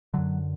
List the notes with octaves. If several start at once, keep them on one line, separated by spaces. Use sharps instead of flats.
F#2 D3 F#3